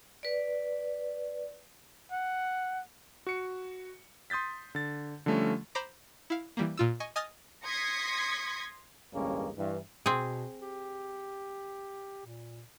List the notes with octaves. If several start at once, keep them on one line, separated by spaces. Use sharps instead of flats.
B4 D5
F#5
F#4 C#7
C6 D#6 G6 A6 B6
D3 A6
D3 F3 G3 A3 C#4
C5 A#5 B5 D6
E4 F5
E3 G3 A#3
A#2 F4 E6
D#5 G#5 C#6
D#5 G#5 D#6 F6 A6
C6 D#6 G#6 A#6 B6 C#7
A1 D2 G2 G#3 A#3 C#4
G2 E3
B2 C4 G#4
G4
A#2